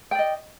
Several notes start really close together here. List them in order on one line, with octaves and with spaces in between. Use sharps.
G5 D5 D#5